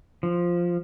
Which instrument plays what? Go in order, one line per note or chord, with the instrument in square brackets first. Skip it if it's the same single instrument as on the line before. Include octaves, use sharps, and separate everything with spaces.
[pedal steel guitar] F3